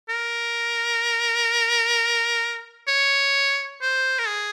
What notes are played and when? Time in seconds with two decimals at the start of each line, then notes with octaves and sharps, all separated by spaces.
0.09 A#4
2.88 C#5
3.81 C5
4.18 A#4
4.27 G#4